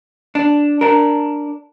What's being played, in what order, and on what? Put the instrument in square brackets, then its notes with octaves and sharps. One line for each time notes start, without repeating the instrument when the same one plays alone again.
[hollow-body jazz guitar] D4
D4 A#4